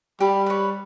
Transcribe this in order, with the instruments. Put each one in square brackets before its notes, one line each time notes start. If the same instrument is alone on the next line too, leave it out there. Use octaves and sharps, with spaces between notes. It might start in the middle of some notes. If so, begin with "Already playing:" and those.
[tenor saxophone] G3 [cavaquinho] G4 [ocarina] B5
[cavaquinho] B4 C#5